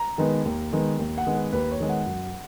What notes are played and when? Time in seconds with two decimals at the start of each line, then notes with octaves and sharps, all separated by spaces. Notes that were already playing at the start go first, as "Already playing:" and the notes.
Already playing: A#5
0.18 D#3 G#3 B3
0.45 D#2
0.73 D#3 G#3 B3
0.99 D#2
1.18 F#5
1.27 D#3 G#3 B3
1.35 B4
1.52 D#2 B4
1.71 C#5
1.80 D#3 G#3 B3
1.89 F#5
2.07 F#2